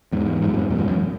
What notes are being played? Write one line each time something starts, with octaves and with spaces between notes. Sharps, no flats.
E2 G#2
G#2
F#2
E2 G#2
F#2 B2
E2 G#2
F#2